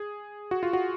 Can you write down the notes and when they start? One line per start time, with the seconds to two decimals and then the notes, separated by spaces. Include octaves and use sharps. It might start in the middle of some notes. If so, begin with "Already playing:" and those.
Already playing: G#4
0.51 F#4
0.63 F4
0.73 F#4